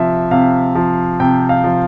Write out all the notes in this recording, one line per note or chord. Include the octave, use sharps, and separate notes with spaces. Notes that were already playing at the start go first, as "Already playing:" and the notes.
Already playing: C3 F3 E5
C3 F5
F3
C3 G5
F5
F3